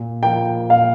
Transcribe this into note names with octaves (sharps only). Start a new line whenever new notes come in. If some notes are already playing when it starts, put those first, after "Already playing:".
Already playing: A#2
F3 A#3 G5
A#2 F5